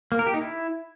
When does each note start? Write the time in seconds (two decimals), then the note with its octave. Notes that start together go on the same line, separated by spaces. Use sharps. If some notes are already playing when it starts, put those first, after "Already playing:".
0.12 A#3
0.19 A#4
0.26 G4
0.34 D#4
0.41 E4